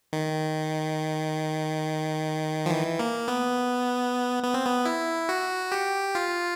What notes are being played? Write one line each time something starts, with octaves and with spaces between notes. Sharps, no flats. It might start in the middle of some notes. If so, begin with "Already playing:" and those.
D#3
F3
E3
A#3
B3
B3
C4
B3
E4
F#4
G4
F4